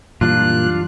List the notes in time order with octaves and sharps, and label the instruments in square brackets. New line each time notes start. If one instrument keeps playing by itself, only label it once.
[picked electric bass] F#2 E3 G3 [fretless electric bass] A#2 [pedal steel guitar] D4 F4 [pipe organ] F#6